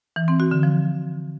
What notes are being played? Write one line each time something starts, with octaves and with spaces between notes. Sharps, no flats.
E3
C4
F#4
D3
F3